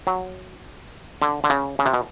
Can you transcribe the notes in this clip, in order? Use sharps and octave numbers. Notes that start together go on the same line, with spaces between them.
F#3
D3
D3
C#3
C#3
C3
B2